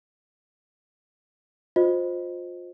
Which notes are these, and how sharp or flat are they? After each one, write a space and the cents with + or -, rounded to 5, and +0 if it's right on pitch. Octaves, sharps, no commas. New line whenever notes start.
F4 +30 C5 +0 D#5 +0